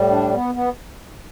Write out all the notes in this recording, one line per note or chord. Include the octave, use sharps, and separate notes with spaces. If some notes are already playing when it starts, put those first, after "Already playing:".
Already playing: A2 G3
D4
B3
B3